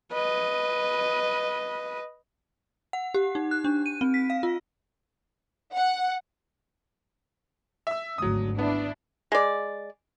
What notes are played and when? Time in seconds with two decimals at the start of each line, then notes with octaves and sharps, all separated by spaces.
0.12 B4 D#5
2.93 F#5
3.14 G4
3.35 D#4
3.51 F#6
3.64 D4
3.86 D#7
4.01 C4
4.14 B6
4.30 F5
4.43 F4
5.75 F#5
7.87 E5 E6
8.18 G#1 D2 D3 F#3 D#6
8.59 B3 D4 E4
9.32 G#3 D5